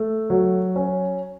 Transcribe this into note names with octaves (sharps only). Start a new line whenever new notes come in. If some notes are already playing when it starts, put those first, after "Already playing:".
Already playing: A3
F#3
C#4